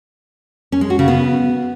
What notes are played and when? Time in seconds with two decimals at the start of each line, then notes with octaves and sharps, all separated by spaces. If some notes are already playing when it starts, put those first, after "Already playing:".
0.72 C#4
0.81 G#3
0.90 F#4
0.99 C#3
1.08 B3